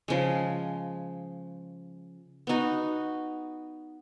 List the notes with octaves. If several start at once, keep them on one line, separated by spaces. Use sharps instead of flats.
C#3 F3 G#3
B3 D#4 F#4